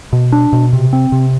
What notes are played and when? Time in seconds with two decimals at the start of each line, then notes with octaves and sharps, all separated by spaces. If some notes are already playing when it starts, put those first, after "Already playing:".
0.13 B2
0.32 D4
0.53 B2
0.73 C3
0.93 C4
1.12 C3